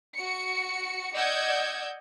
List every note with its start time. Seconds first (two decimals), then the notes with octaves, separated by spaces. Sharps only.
0.16 F#4 C#7
1.13 D5 D#5 F#5 E6 G6 G#6